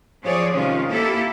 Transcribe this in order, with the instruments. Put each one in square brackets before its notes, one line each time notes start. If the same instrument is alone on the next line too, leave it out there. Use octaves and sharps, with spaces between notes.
[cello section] F3 G#4 C#5 D5
C3 D#3 G#3 C#4 F4
A#3 E4 G4 A4